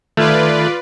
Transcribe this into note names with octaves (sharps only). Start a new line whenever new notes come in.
D#3 A3 F4 B4 D5 F6 G#6